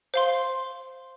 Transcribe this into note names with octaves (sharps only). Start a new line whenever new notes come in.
C5 F5 C6